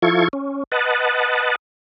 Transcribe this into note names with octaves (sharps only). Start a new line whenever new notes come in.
F3 E4 F4 A4 C#6 G#6
C#4
B4 D#5 F#5 A5